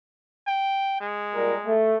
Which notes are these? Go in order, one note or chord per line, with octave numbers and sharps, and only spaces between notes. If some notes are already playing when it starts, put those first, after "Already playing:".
G5
G#3
A#2 G3 A#4
A3